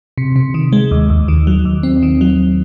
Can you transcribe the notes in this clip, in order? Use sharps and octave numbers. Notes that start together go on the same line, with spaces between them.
C3
C3
D#3
G#3
D#2
D#2
D#3
F#3
D#2
C4
D#3
F#3